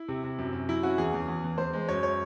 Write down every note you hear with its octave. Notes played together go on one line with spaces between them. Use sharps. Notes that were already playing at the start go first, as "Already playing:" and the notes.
Already playing: E4
C3
C3
F#2
F#2
F#3 E4
C#4 F#4
E2 G#4
E2
E2
E2
E2 C5
G#3
F#2 C#5
C#5